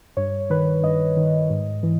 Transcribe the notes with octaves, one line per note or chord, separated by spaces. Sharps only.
G2 C#5
D#3 B4
G2 D#5
D#3
G#2
E3